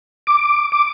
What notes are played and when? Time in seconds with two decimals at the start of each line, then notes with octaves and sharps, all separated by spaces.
0.27 D6
0.72 D6